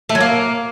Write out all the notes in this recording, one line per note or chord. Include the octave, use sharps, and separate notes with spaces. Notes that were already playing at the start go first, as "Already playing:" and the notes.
A3
F#3
A#3